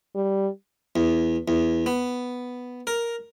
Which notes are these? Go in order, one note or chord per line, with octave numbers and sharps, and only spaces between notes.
G3
E2
E2
B3
A#4